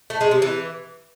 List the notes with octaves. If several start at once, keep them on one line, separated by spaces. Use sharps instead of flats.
A3
G#3
C3
E3